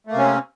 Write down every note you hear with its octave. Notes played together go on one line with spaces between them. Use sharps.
C3 A3 A#3 C4 C#4